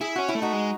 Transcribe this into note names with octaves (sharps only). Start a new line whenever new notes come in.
E4 G#4
C#4 F#4
E4
A3
D#4 F#4
G#3